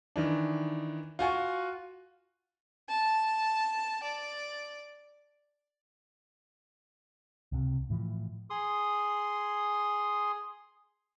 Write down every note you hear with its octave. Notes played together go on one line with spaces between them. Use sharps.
D#3 E3 D4
F4 F#4 G#5 C#6
A5
D5
C#2 C3
A2 E3 F3
G#4 C6 D#6